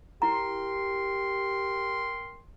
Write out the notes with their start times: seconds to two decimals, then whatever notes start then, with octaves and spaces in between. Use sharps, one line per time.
0.22 E4 G4 A#4 G5 A#5 C6